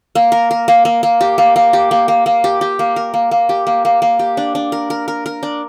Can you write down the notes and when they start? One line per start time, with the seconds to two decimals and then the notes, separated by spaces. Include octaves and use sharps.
0.15 A#3
0.32 A#4
0.51 A#4
0.68 A#3
0.85 A#3
1.03 A#3
1.21 G4
1.38 A#3
1.56 A#3
1.73 G4
1.91 A#3
2.08 A#3
2.26 A#3
2.44 G4
2.61 G4
2.79 A#3
2.96 A#4
3.14 A#3
3.31 A#3
3.49 G4
3.67 A#3
3.85 A#3
4.02 A#3
4.19 G4
4.37 D4
4.55 D4
4.72 A#4
4.90 A#4
5.08 A#4
5.26 A#4
5.43 D4